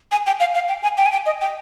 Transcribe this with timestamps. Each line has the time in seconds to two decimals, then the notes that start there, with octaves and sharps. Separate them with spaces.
0.12 G#5
0.26 G5
0.40 F5
0.54 F5
0.68 G5
0.83 G#5
0.97 G5
1.06 G#5
1.12 G5
1.26 D#5
1.41 G5